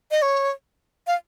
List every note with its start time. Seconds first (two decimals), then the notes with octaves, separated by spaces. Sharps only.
0.11 D#5
0.22 C#5
1.07 F5